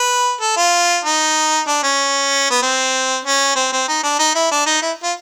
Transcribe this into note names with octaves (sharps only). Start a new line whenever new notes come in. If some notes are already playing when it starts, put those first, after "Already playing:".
Already playing: B4
A4
F4
D#4
D4
C#4
B3
C4
C#4
C4
C4
D#4
D4
D#4
E4
D4
D#4
E4
F4